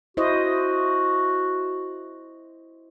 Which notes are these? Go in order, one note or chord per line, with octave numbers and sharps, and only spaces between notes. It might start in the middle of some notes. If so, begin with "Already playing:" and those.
E4 F#4 C5 D#5